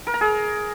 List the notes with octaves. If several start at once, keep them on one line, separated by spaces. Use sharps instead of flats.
A#4
A#5
G#4